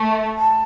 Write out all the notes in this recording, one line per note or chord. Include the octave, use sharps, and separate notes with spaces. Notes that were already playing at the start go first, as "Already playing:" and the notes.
Already playing: A3
A5